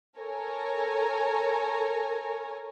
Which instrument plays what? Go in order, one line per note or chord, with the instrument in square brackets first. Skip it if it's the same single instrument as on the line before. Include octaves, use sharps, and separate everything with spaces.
[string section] A4 A#4 C#5 G#5 A#5